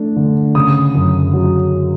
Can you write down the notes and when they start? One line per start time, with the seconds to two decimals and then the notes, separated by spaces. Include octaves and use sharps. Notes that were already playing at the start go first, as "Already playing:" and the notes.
Already playing: A3 D4
0.16 D3
0.55 C#3 D#6
0.95 F#2
1.33 F#3